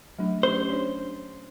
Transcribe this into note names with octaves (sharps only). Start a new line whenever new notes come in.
F#3 A3 D4
C#4 G4 C5
D4 C#5 D5